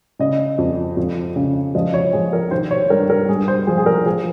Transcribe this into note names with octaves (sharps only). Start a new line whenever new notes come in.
C#3 D#5
F2
F2
C#3
F3 D#5
C#5
F3 G#4
A#4
D#3 C5
C#5
G2 A#4
A#4
G2 G#4
C5
F3 G#4
G#4
A#4
F3 G#4